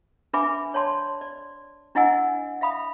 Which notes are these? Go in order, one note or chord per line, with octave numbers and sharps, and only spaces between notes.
D4 B4 E5 G#5 B5 D6
C#5 D5 A5 C6
D5
D4 E4 D#5 F#5 G#5 E6
E5 F5 B5 D#6